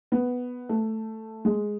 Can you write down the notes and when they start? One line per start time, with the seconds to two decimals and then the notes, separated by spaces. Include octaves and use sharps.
0.12 B3
0.69 A3
1.45 G#3